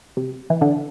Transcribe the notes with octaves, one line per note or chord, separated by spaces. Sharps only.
C3
E3
D3